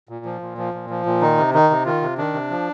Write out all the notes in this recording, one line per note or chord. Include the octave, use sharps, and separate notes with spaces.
A#2
F3
A#2
F3
A#2
F3
A#2
D#3 D#4
C3
D#3 D#4
C3
D#3 F4
C3
D#3 D4
C3
F3